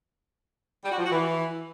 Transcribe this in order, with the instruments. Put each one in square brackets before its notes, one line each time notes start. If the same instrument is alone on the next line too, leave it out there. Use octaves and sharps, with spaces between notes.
[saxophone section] G3
F#4
F3
F#4
E3